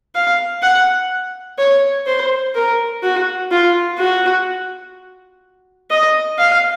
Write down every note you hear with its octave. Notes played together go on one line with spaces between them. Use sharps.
F5
F#5
C#5
C5
A#4
F#4
F4
F#4
D#5
F5